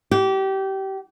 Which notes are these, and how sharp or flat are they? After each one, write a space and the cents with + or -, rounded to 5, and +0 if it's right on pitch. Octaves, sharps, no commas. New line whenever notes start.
G4 -25